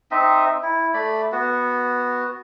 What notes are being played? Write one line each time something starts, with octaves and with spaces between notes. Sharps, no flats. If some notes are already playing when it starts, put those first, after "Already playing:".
C4 D#4 D#5 E5
E4
A3 D5 B5
B3 F#4